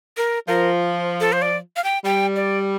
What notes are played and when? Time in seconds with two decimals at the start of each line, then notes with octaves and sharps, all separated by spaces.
0.17 A#4
0.48 F3 A#4
1.20 A4
1.32 C5
1.42 D5
1.76 F5
1.84 G5
2.05 G3 G5
2.36 D5